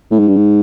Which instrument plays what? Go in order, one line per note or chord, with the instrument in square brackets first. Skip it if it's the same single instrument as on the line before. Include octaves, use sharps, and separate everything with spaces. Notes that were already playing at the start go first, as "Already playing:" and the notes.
[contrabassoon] A2
G#2
G2
G#2